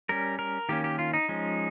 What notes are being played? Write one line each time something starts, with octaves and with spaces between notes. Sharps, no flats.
G3 C#4 A#4
A#4
D#3 A#3 C#4 G4
G4
F4
D#4
F3 G#3 C#4